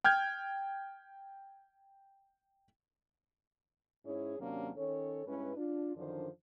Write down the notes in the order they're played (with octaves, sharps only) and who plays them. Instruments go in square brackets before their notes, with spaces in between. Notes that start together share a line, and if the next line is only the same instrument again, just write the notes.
[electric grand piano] G5 F6 G6 G#6
[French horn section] G#2 C#4 E4 G#4 C#5
D#2 C3 F#3 A#3 C#4 D4
D#3 C#4 A4 C#5
G2 G#3 C#4 E4 B4
D4 F4
F#2 D3 D#3 F3 D4 C5